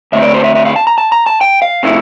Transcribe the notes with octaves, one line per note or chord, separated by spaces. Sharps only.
D2 D3 A3 C4 E5
D5
C5
E5
E5
F5
A5
A#5
A5
A#5
A5
G5
F5
C3 F3 A3 E4